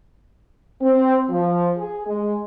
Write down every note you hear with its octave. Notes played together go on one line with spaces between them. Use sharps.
C4
F3
G#4
G#3